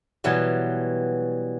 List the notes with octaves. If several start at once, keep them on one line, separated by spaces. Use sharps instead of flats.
B2 E3 F#3 G3